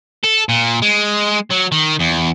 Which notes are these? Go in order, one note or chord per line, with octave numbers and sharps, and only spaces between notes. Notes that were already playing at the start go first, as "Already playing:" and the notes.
A4
A#2
G#3
F#3
D#3
E2